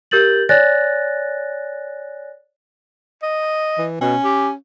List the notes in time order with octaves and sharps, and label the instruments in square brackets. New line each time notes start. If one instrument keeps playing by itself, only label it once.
[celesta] G4 A#4 G6 A6 F#7
C#5 D5 G#5 F#6 A6 A#6
[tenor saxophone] D#5
[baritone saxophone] E3
[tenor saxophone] B2 [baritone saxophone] C#4
[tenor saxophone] G4